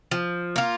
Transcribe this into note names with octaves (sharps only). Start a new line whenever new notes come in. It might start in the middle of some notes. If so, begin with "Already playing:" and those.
F3
A#3 F4